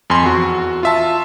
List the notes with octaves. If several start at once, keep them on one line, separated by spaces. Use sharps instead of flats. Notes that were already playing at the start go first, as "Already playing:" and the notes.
F2 G#5 C6
E2 F#4
F4 E5 A5